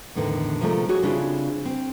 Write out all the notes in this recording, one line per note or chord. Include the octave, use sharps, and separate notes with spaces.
E2 A2 D3 D#3
C3 F3 G#3 A3 F4 A#4
F#4 G#4 C#5
C#3 C4 D4 E4 F4 G#4
C4